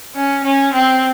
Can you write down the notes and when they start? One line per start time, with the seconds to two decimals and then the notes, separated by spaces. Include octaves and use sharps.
0.15 C#4
0.44 C#4
0.73 C4